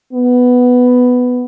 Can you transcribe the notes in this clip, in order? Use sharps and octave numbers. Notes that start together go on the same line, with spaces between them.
B3